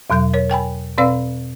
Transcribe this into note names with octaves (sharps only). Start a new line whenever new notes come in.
E2 B2 F#3 G6
A#4 C#5
A#4 G5 G#5 B5
B2 C4 B4 D5 F5 E6